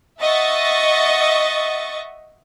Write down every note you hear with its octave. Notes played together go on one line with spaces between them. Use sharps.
D#5 E5 F#5 C#6 A6